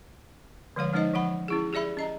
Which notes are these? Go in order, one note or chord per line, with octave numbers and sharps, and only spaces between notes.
D3 F3 G#3 C#5 F5
F3 G#3 C#4 D#4 C5 D#5
E3 F3 F#5 B5
C#4 E4 G#4
G4 G#4 D5 E5 B5
C#4 D#5 A#5